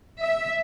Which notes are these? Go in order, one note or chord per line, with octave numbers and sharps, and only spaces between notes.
E5